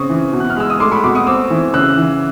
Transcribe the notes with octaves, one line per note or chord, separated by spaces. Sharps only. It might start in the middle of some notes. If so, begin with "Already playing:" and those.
Already playing: C#3 C4 C#6 D#6
E3
B2
F#6
F6
G#3 E6
D#6
A3 C6 D6
B5 C#6
B2 C6 D6
C#6 D#6
C4 D6 E6
E3
C#3 E6 F#6
E3